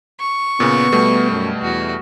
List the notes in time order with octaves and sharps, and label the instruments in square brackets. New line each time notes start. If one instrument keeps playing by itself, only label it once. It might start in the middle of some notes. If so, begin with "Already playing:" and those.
[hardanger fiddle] C#6
[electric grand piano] A#2 C#3 [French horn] B3
[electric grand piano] B2 G3 A3
[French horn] F#2
[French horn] E2 [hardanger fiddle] F#4